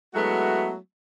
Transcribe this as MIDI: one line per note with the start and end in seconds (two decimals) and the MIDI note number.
0.14 0.75 54
0.14 0.75 56
0.14 0.75 57
0.14 0.75 59
0.14 0.75 64
0.14 0.75 66